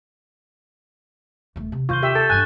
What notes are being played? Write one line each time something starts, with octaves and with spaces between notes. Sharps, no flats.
D#1 A3
C3
D#2 C3 F4 C#6 G6 G7
G4 E5
A4 A6 E7
G2 D4 G#5 F#6